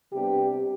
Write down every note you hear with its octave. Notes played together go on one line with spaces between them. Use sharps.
C3 G3 B3 D4 G4